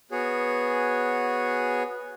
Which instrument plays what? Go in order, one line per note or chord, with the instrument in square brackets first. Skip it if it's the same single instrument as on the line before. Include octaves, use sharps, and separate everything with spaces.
[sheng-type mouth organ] B3 F#4 G#4 C#5